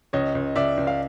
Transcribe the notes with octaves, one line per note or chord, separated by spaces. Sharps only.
C#2 C#5 D#5
C#2
C#2 D5 E5
C#2
F5